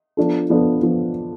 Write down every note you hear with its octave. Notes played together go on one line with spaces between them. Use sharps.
F3 B3 D4 F4 A4
F3 B3 D4 F4 A4
F3 B3